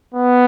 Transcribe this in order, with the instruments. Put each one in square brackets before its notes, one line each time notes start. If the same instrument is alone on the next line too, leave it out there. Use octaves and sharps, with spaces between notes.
[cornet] B3